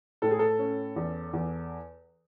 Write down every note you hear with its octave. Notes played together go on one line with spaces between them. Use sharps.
A2 A4
G#4
A4
C#4
E2
E2